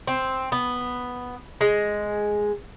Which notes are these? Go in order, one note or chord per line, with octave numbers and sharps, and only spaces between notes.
C4
B3
G#3